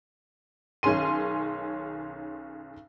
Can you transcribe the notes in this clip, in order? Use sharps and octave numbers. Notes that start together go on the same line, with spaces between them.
B1 D#3 C#4 G#4 C6 D#7